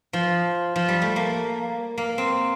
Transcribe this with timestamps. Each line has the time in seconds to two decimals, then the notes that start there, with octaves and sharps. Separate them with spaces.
0.13 F3
0.76 F3
0.89 G3
1.02 A3
1.16 A#3
1.98 A#3
2.18 C4